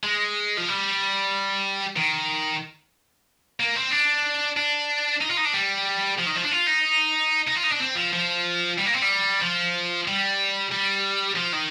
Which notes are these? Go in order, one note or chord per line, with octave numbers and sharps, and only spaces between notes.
G#3
F3
G3
D#3
A#3
C4
D4
D4
D#4
F4
D#4
D4
G3
F3
D#3
F3
D4
F4
D#4
D#4
F4
D#4
D4
C4
F3
F3
G3
A#3
C4
G3
F3
G3
G3
F3
D#3